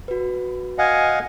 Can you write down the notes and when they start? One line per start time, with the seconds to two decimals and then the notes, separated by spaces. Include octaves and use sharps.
0.08 F#4 B4
0.78 D#5 F5 F#5 G#5